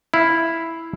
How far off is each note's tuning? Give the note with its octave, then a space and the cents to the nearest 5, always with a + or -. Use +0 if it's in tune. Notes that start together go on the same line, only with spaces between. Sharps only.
E4 +0 F5 +0